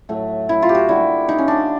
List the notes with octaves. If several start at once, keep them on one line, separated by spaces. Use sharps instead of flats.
A2 F#3 A3
E4
F4
G4
F#4
D3 G3 A#3 E4
D#4
C#4
D4